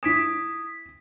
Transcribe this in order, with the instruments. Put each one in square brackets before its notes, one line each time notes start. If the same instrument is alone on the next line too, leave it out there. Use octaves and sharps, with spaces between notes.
[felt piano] E4 D7 E7 [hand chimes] D#6 G#6 B6